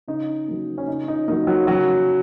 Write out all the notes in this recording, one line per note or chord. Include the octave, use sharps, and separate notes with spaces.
C#3 D#4
F#3 A#3
C#4
C#3 D#4
D#4
F#3 A#3 D#4
F#3 F#4
C#3 F#3 F#4